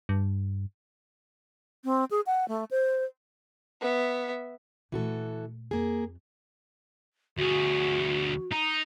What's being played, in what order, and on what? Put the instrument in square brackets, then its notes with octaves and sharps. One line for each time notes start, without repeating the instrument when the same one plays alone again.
[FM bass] G2
[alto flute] C4
G#4
F#5
A3
C5
[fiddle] B3 E5
[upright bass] A#2 A3 [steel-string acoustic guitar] E3 F#4 A4
[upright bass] F2 [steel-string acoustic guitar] A#3 G#4
[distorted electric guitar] D2 G#4 [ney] F#4
[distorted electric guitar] D#4